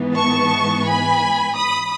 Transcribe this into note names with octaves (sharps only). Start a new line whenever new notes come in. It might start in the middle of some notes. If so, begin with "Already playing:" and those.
Already playing: G#2 E3 B3
A5 C#6
G#5 B5
B5 D#6